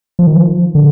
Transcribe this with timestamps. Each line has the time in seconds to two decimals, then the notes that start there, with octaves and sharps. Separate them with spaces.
0.19 F3
0.27 D#3
0.37 F3
0.75 D3